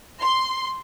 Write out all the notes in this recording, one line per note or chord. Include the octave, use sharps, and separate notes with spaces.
C6